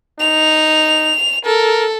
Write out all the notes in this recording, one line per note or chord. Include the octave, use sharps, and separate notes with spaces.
D#4 F7
A4 A#4